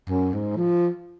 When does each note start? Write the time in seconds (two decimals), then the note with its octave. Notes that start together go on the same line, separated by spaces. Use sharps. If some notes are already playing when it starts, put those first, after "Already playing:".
0.09 F#2
0.33 G#2
0.57 F3